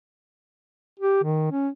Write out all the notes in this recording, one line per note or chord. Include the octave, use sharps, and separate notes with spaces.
G4
D#3
C#4